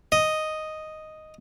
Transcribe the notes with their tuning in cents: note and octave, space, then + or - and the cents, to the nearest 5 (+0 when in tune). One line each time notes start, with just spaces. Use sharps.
D#5 +0